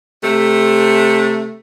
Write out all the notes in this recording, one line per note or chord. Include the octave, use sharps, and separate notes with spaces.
C3 A3